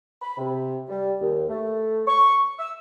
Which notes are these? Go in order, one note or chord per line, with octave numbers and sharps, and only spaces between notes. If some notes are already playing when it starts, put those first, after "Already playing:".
B5
C3
G3
D#2
A3
C#6
E6